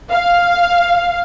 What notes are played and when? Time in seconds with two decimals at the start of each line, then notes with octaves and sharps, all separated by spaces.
0.11 F5